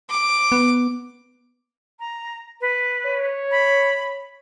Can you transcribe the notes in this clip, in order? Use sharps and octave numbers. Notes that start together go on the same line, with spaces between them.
D6
B3
A#5
B4
C#5
B5